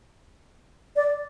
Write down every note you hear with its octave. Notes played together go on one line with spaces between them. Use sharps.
D5